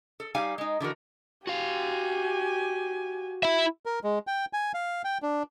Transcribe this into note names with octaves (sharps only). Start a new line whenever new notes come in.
A4
G3 D#4 F5 G#5
G#3 D#4
D3 E3 F#4 A#4
F#4 G4 F5 G#5
E4 E5
A#4
G#3
G5
G#5
F5
G5
D4